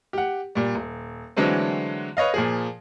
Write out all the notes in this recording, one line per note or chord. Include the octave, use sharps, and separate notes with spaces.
G4 F#5
A#2 G3
D#1
D3 E3 F#3 G#3 A3 C4
B4 C#5 D#5 F5
A#2 F3 G#4